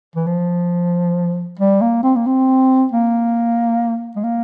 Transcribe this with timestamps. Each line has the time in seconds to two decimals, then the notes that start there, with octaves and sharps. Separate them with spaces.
0.16 E3
0.27 F3
1.59 G3
1.81 A#3
2.03 C4
2.16 A#3
2.26 C4
2.92 A#3
4.16 G#3
4.24 A#3